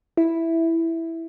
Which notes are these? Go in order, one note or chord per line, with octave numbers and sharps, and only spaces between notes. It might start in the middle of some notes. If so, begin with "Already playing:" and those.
E4